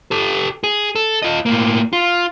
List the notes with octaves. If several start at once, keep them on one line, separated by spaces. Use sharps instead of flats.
G4 A4
G#4
A4
F4 D#5
A2 A#3
F4